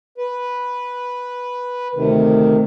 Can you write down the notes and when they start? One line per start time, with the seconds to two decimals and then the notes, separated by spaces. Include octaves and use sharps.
0.18 B4
1.95 D2 C3 D#3